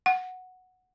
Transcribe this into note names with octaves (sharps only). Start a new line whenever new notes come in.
F#5